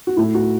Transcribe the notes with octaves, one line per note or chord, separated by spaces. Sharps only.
F#4
A2 A3 E4
F#4